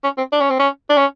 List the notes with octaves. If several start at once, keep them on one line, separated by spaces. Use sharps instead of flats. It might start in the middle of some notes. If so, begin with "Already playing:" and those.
C#4
C4
D4
C#4
C4
C#4
D4
C#4